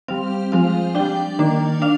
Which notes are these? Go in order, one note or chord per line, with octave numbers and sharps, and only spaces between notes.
G3 C4 F5
F3 G#3 C4 F5
G3 D4 G5
D#3 A#3 D4
D4 F5